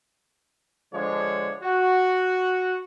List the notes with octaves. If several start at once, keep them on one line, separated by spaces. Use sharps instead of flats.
D3 F3 G#3 D4 C#5
F#4